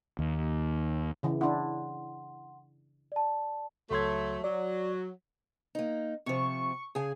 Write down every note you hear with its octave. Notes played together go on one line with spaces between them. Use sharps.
D#2
C#3 E3
D4 E4 F#5 C6
D5 A5
C#2 F#3 A3 C6 G#6
F#3 D5
A#3 D#4
C3 F3 C#6
C#3 G#4 G#5